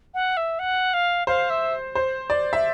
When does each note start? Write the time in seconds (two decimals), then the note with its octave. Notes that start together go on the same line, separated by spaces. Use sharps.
0.14 F#5
0.37 E5
0.59 F#5
0.93 F5
1.27 C5 F5
1.50 E5
1.95 C5
2.30 D5
2.53 E5